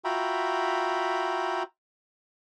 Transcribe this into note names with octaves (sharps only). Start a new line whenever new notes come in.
F4 F#4 E5 G5 A#5 B5